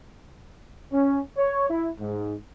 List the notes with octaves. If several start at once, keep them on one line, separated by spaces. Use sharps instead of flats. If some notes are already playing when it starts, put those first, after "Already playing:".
C#4
C#5
E4
G#2